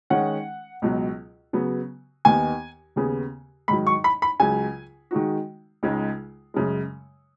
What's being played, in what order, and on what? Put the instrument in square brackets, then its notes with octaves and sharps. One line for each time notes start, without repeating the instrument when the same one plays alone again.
[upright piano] D#3 G#3 C#4 [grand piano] F#5
[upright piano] C#2 B2 F#3
C#3 F#3 B3
[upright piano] D#2 D#3 B3 [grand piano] G#5
[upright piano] D#2 C#3 B3 G#4
[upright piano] G#2 D#3 F#3 [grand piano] B5
[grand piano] C#6
B5
B5
[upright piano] C#2 C#3 F#3 [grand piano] G#5
[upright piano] D#3 G#3 D#4 F#4
C#2 C#3 G#3 D#4
F#2 C#3 G#3